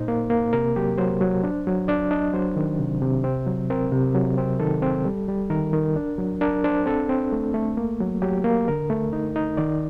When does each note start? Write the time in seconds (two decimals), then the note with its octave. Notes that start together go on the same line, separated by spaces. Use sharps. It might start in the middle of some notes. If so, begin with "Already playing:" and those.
Already playing: A#2 D#4 C5
0.08 A#3
0.30 A#3
0.53 C3 A#4
0.76 F#3 G4
0.98 F#3 C5
1.21 F#3
1.43 D4
1.67 F#3
1.88 D4 D5
2.11 D4 D#5
2.34 F#3 C5
2.56 D#3
2.79 C3
3.02 C3
3.24 C4
3.47 F#3
3.70 C4 A#4
3.92 C3
4.15 F#3
4.38 C4
4.60 D#3 A4
4.82 C4
5.05 G3
5.28 G3
5.50 D#3 A#4
5.73 D#3
5.96 D4
6.18 F#3
6.41 D4 A#4
6.64 D4 C5
6.86 C4 A4
7.09 C4
7.32 A3
7.54 A3
7.77 A#3
8.00 F#3
8.22 F#3 G4
8.44 A#3
8.68 D3 A#4
8.90 A3
9.13 D#4
9.36 D#4
9.57 D#3 D5